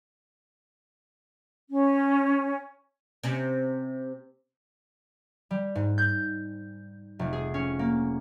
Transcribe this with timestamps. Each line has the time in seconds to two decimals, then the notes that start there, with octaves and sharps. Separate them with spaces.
1.70 C#4
3.24 C3 C#4
5.51 G3
5.75 G#2
5.98 G6
7.19 F1
7.33 G#4
7.54 C#4
7.79 A#3